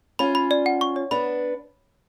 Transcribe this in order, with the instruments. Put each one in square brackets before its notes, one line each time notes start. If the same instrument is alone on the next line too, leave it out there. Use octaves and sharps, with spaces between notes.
[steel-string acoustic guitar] C#4 F4 [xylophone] B5
[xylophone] B5
D5
F#5
C#6
C#5
[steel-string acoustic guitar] B3 D4 [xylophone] B5